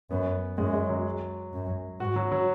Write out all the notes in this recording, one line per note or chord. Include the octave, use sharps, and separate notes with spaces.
F#2 B3
F#2 G#3
G#3
F#3
F#2
G#2 F#4
F#3
F#3